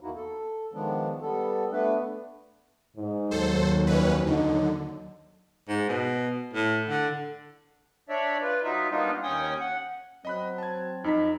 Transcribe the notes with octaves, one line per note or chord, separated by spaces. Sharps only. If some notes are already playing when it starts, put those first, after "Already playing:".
E2 A#3 D#4 E4 F#4
A4
D#3 F3 G#3 B3 D4
G3 B3 A4
A3 B3 D4 B4
G#2
D#2 F#3 A4 C5
F2 C#4 B4
D3 D#4
G#2
B2
A2
D3
D4 C#5 D5 E5
F4 B4
F#3 D#4 F4 E5
G3 A#3 B3 D4 D#4 F4
D#2 C#4 G5 G#5 D#6
F#5
F#3 C4 D#5 B5 F#6
A5 G#6
F2 D#4 A#5 B6